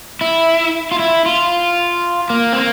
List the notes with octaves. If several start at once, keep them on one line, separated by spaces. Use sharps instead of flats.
E4
F4
E4
F4
A#3
C4
A#3